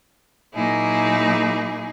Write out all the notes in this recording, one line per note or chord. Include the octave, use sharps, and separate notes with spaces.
A#2 F#3 A#3 D#4 E4 G#4